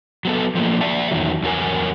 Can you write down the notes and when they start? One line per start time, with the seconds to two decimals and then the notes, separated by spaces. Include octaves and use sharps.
0.25 F#3 B3 A4
0.55 F3 A3 A#3
0.81 D5 E5 A5
1.11 E2 D#3 F#3
1.43 E2 F#3 F4 A#4 G#5